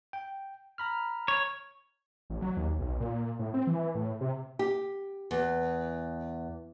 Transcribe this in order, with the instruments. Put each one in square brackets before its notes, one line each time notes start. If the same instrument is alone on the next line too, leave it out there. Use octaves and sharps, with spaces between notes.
[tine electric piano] G5
A#5 B5 F6
[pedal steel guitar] C#5
[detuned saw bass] A1
F#3
D#2
B1
A#2
A2
C4
E3
A2
C3
[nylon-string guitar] G4
E2